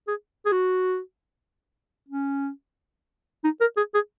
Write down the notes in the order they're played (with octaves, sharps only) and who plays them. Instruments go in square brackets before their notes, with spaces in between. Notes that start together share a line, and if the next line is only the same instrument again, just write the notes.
[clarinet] G#4
G#4
F#4
C#4
D#4
A#4
G#4
G#4